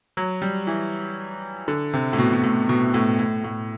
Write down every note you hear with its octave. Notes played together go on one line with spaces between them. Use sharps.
F#3
G3
E3
D3
C3
A2
B2
B2
A2
B2
A2
A2
A2